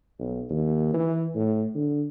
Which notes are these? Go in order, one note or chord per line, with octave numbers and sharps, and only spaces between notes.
B1
D#2
E3
A2
D3